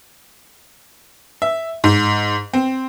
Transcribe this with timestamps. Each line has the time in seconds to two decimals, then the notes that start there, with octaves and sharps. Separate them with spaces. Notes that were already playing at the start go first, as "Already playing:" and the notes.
1.42 E5
1.84 G#2
2.53 C4